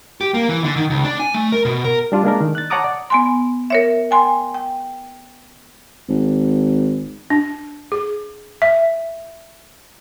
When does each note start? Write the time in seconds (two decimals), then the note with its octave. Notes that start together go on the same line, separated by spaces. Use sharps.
0.21 G4
0.34 A#3
0.49 E3
0.64 D3
0.76 D#3
0.90 C#2
1.04 D4
1.20 G#5
1.34 A3
1.52 A#4
1.65 B2
1.84 A#4
2.12 G3 D4 F4
2.24 G#3 A#3 D4 A#4
2.41 D#3
2.55 F#6 A6
2.70 C#5 F#5 A5 A#5 D6 D#6
2.84 D5
3.10 B3 G#5 C6
3.70 A#4 C#5 E5
4.11 G5 G#5 C6
4.54 G5
6.09 G#1
7.30 D4
7.92 G#4
8.62 E5